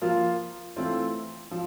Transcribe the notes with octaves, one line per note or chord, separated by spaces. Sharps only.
F3 A#3 F4
E3 A3 C4 F4
F3